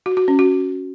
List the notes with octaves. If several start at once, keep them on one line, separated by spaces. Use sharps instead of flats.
F#4
F#4
C#4
F#4